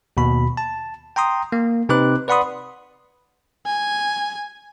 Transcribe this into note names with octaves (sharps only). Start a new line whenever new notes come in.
D#2 B2 B5
A5
G5 A#5 C6 D#6
A#3
C3 C4 D#4 B4 D6 F#6
B4 D5 F#5 B5 C6 D#6
G#5